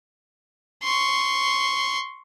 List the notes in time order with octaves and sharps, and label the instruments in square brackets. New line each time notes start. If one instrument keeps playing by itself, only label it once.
[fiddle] C6 C#6